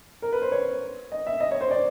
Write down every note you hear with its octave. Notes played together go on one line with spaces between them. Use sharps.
A#4
B4
C5
C#5
D#5
E5
D#5
C#5
C5
D5